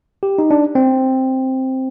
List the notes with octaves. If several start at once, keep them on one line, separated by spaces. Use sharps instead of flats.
G4
D#4
D4
C4